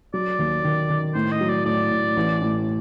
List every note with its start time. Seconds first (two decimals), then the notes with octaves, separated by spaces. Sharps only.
0.14 F#3 D5
0.39 D#2
0.64 D#3
0.90 D#3
1.15 A2 C5
1.32 D#5
1.41 F#3
1.49 D5
1.66 A2 D5
1.91 A2
2.17 A1
2.42 A2